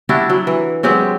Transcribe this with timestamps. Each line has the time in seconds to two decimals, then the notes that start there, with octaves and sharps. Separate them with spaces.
0.09 G3 D4 E4 F#4
0.30 F#3
0.47 E3
0.83 F#3 G#3 C4 G4